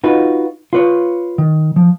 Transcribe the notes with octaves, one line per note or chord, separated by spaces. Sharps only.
D#4 F4 F#4 B4
F4 B4 C#5
D#3
F3